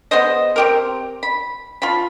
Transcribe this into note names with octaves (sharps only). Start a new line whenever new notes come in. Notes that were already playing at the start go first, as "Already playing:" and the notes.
B3 G#4 C5 D#5
C4 G4 A#4
B5
F4 A5 B5